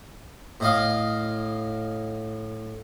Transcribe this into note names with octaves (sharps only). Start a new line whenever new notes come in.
A2 D#5 F5